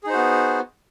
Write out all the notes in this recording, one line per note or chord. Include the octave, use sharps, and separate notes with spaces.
B3 D#4 F#4 G#4 C5